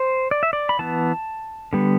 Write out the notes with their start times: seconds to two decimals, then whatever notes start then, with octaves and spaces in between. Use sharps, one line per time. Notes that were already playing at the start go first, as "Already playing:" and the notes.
Already playing: C5
0.31 D5
0.43 E5
0.53 D5
0.69 B5
0.79 E3 B3 A5
1.73 D3 G3 B3